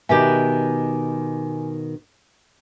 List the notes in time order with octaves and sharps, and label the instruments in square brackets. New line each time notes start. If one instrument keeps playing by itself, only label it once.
[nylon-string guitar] B2 D#3 [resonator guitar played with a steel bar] G4 B4 E5 [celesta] G#5